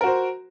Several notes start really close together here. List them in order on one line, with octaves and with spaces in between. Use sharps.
A#4 F#4 C5